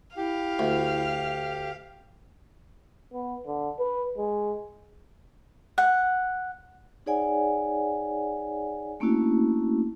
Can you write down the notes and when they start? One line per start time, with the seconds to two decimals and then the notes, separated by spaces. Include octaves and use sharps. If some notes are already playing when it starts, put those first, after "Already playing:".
0.17 E4 G4 F5
0.59 D2
3.13 B3
3.46 D3
3.79 B4
4.17 G#3
5.78 F#5
7.06 D#4 G#4 C#5 D5 F#5 G#5
9.00 A3 A#3 C#4 D4 E4 F#4